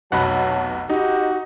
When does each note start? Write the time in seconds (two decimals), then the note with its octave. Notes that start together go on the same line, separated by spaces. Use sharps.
0.12 F1 B1 B2 F#3 F#5 A5 B5
0.89 D#4 F#4 G4